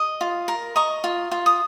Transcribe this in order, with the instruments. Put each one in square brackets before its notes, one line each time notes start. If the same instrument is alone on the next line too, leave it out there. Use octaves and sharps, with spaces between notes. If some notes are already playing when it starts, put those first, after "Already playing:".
Already playing: [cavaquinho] D#5
F4
A#4
D#5 A#5 C#6
F4
F4
D#6